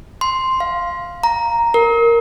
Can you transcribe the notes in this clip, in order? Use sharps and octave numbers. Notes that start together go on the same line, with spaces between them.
C6
F5
A#5
A#4